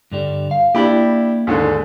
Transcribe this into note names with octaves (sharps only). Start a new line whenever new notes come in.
G2 D3 G3
F5
A#3 D4 E4 G4 B5
D#2 G#2 D3